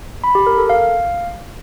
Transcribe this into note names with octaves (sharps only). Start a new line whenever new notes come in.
B5
G4
A#4
A4
F5